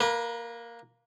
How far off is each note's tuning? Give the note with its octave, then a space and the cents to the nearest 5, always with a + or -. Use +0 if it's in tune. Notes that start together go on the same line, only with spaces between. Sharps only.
A#3 +0 B4 -30